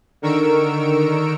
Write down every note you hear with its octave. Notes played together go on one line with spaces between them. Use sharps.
D3 D#3 A#4 C#6 E6 D7